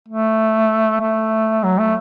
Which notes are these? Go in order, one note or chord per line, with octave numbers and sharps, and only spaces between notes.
A3
A3
F#3
A3